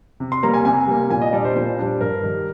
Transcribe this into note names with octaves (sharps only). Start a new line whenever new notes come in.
C3
C6
G3 A#3 A#5
G#5
C3 G#5
G3 A#3
A#2 G#5
D#5
G3 D4 D5
C5
A#2 C5
G3 D4
G2 A#4
D#3 G3